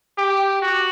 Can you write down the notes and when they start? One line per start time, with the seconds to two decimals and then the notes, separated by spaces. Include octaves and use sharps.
0.18 G4
0.62 F#4